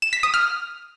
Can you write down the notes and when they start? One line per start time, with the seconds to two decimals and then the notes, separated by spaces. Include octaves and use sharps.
0.02 E7
0.13 B6
0.23 D#6
0.34 F6